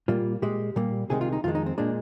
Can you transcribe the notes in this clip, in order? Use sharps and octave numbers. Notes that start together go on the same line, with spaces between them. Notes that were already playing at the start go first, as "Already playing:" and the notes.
A#2 G3 A#3 F4
A#2 G#3 G4
A#2 G3 A#3
C2 C3 D#3 G#3 G#4
F4
D#4
F2 D#3 G#3 F4
D#4
C4
A#2 G#3 D4